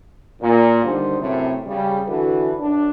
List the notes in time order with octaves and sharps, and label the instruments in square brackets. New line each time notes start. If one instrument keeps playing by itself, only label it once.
[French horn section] A#2
D3 D#3 G3 C5
F#2 A2 C3
C#3 G3
D3 E3 F#4 A4 B4
F#2 D4